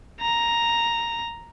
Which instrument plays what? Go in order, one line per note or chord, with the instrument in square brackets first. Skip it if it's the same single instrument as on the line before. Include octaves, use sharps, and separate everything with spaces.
[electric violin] A#5